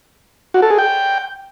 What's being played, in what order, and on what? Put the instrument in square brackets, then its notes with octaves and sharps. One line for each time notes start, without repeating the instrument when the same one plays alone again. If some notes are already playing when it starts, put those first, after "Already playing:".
[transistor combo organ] F#4
A4
G#4
G5